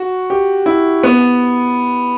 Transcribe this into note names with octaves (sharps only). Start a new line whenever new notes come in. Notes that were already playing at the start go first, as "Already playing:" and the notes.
Already playing: F#4
G4
E4
B3